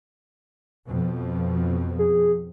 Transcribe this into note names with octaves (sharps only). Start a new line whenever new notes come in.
F2 B2 F3
G#4